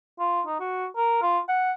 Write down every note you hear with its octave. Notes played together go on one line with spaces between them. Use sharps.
F4
D#4
F#4
A#4
F4
F#5